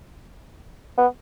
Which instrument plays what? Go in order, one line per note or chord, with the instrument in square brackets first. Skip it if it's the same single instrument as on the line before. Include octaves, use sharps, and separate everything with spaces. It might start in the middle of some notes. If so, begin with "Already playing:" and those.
[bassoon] B3